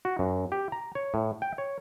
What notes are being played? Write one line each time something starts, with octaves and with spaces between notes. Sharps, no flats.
F#4
F#2
G4
A#5
C#5
A2
G5
C#5